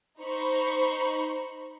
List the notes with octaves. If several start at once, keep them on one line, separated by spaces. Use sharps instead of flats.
D#4 C5 A#5 B5 C#6